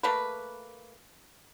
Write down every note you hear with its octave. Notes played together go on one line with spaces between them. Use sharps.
A3 A#3 B4